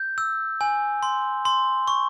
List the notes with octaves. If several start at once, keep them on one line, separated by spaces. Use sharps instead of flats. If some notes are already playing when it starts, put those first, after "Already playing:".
Already playing: G6
E6
G#5
C6
C6
C#6